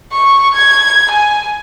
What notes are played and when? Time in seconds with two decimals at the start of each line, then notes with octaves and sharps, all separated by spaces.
0.12 C#6
0.55 G#6
1.11 G#5